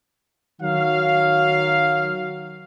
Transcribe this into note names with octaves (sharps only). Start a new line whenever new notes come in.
D#3 F#3 F5